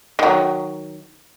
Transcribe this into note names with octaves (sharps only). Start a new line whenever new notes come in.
D#3 F#3